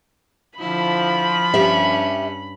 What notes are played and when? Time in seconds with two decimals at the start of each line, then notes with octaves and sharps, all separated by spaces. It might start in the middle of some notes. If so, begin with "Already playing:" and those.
0.60 D3 F3 E4 B5
1.54 G2 C#4 G4 E5